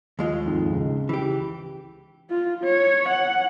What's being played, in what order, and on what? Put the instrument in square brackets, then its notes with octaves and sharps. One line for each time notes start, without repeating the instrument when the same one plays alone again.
[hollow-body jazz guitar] D#2 G#3 F4
[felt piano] F2 G#2
C#2
[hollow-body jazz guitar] E3 G4
[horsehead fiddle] F4
C#5
F#5